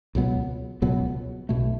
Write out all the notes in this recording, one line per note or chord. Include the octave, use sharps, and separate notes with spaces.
C#2 B2 F#3 B3
C#2 B2 F#3 B3
B1 B2 A3